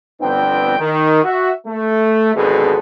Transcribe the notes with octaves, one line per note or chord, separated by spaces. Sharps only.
G1 F2 B3 C4 D4 G5
D#3
F#4 E5
A3
G#1 F2 B2 D3 G#4 A4